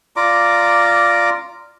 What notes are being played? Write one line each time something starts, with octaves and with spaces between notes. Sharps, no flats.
F4 D5 A#5 D6